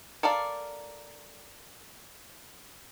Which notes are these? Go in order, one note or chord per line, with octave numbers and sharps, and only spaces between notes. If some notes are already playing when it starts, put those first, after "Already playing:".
A4 A#4 D5 F5